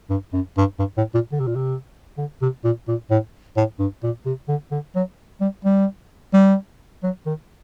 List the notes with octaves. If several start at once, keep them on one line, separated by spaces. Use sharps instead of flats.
G2
F#2
G2
G2
A2
A#2
D3
C3
A#2
C3
D3
C3
A#2
A#2
A2
A2
G2
A#2
C3
D3
D3
F#3
G3
G3
G3
F#3
D#3